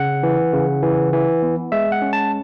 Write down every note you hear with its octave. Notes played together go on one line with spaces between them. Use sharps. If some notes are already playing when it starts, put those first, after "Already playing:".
Already playing: C#3 F#5
E3
C#3
E3
E3
B3
G#3 E5
F#5
C#4
A5